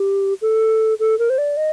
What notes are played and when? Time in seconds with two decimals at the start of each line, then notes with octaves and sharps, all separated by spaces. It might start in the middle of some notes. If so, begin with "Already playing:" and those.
Already playing: G4
0.42 A4
1.00 A4
1.19 A#4
1.30 C5
1.38 D5
1.57 D#5